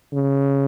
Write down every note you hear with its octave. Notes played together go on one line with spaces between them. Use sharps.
C#3